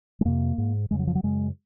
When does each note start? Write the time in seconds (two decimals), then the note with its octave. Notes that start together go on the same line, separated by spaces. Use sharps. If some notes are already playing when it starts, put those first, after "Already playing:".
0.21 G#3
0.25 F2 C3 A#3
0.58 G#2
0.91 F2 C#3 G#3
0.99 F#3
1.07 F3
1.15 F#3
1.23 F#2 C#3 G#3